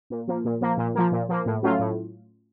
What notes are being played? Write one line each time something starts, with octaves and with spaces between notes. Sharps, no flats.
A#2
F3 A#3
A#2
F3 A#3
A#2
F3 A#3
A#2
F3 A#3
A2
F#3 A3 C#4 F4
A2